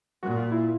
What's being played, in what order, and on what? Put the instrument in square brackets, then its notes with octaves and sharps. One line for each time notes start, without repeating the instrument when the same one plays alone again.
[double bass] A#2 [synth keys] F#4
[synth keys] F4
E4